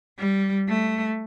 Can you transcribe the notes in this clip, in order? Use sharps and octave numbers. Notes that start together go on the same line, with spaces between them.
G3
A3